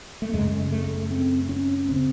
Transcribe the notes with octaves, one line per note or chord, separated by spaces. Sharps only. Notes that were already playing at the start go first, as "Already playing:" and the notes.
A3
F#2 C#3 G#3
A3
C4
C#4
C#3 C4